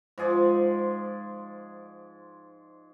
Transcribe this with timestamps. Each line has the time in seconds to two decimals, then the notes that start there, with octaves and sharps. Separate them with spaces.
0.18 G#2 F3 G#4 D5